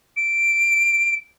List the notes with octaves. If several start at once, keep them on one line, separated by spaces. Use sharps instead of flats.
D7